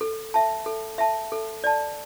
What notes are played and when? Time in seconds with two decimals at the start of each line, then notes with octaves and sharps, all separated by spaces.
0.01 A4
0.34 E5 A5
0.66 A4
0.98 E5 A5
1.32 A4
1.64 D5 A5